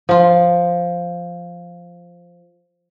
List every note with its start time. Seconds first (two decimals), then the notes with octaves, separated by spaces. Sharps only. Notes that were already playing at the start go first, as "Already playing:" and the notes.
0.09 F3 F4